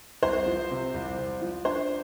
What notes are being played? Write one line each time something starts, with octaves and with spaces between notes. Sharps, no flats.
C2 C5
F3
C3
C2
C2
F3
D4 C5